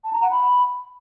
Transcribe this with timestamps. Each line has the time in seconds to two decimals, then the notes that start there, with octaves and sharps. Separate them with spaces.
0.04 A5
0.13 A#5
0.22 F#5
0.31 B5